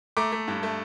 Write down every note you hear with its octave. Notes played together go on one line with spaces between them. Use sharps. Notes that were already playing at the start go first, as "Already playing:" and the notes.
A3 A#5 D6
A3
G2
A3